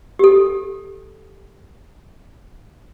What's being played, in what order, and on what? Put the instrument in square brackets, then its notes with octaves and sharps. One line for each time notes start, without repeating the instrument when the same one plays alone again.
[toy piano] G4 A4